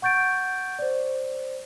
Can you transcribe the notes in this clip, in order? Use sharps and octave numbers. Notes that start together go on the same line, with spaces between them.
F#5 C#6 G6 A6 D7
C5 D5